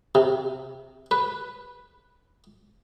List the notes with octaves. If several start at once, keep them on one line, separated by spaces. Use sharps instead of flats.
C3
B4